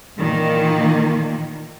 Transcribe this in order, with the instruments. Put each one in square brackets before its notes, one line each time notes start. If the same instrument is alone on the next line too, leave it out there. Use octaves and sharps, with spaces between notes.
[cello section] A#2 D#3 E3 A#3